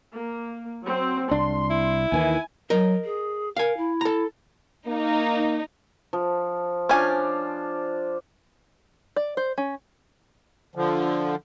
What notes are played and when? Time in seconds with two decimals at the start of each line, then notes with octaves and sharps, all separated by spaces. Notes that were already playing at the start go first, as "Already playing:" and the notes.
0.14 A#3
0.84 F#3 C4
1.31 C2 D4 C6
1.70 E4
2.12 D#2 D#3 E3 G#5
2.70 F#3 A#4 D#5
3.05 G#4
3.57 A#4 F5 G#5
3.77 E4
4.01 A4 A#5
4.87 A#3 D#4
6.13 F3
6.89 C#4 D4 F4 C5 G#5
9.16 D5
9.37 C5
9.58 C#4
10.75 D3 F3